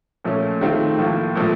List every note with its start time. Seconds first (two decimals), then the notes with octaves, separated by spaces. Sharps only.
0.25 A#2 F3 A3 C#4
0.61 D#3 A3 C4 F4
0.99 A2 F3 A#3 F4
1.35 A#2 F3 A3 C4